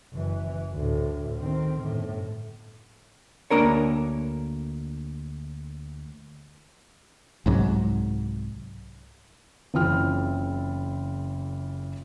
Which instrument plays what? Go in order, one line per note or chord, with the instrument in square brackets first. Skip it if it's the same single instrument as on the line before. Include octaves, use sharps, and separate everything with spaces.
[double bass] F#1 E3
D2 A2
D#3 C4
G1 A2
[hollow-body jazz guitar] D2 D#3 A#3 D4 A#4 C#5
[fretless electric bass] C2 G#2 F#3
[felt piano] F#1 C#3 E3 C4 F4 F6